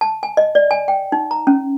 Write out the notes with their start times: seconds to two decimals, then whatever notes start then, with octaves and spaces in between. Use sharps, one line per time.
0.01 A5
0.23 G#5
0.37 D#5
0.55 D5
0.71 G#5
0.88 G5
1.12 D#4
1.31 A#5
1.47 C#4